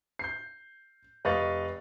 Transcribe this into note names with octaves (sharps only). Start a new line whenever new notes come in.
G6 C7
F1 B4 D#5 F5 C#6 A6